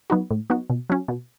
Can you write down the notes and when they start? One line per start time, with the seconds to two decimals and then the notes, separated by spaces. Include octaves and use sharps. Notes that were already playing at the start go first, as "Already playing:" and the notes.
0.10 F#3 B3 D#4 F#4
0.31 A2
0.50 F#3 B3 D#4 F#4
0.70 B2
0.90 F#3 C#4
1.08 B2